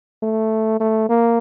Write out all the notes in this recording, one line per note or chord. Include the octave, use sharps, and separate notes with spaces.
A3
A3
A#3